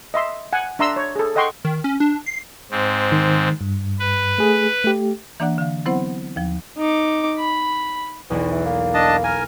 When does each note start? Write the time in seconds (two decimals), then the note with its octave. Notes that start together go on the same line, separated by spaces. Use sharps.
0.14 D#5 E5 C6
0.53 F#5 G#5
0.79 D4 E5 A#5 C6 E6
0.96 C#5
1.16 G#4 A4
1.35 A4 D#5 F#5 G5 C6 C#6
1.65 D#3
1.84 C#4
2.00 D4
2.26 C7
2.71 G#2 C4
3.12 D#3
3.61 G2
3.99 B4
4.38 A3 G#4
4.84 A3 G4
5.40 E3 A#3 D4 D5 F#5 F#6
5.58 D3 F5
5.86 F#3 B3 C4 E4 C5 F#5
6.36 D#2 F3
6.77 D#4 D6
7.38 B5
8.30 B1 E2 B3
8.52 E3
8.66 A#3
8.94 D4 D#5 A5
9.24 A#4 G#5 F6